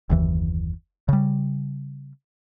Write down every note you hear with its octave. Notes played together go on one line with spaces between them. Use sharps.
F#1 D#2 E3
C#3 G3